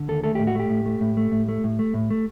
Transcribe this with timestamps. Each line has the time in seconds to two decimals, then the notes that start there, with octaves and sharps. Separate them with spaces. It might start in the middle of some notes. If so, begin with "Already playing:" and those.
Already playing: D3
0.08 D#2 A4
0.24 A3 A4
0.35 A2 G4
0.47 F#4
0.55 A3 G4
0.70 A2
0.86 A3
1.01 A2
1.17 A3
1.32 A2
1.49 A3
1.64 A2
1.79 A3
1.94 A2
2.10 A3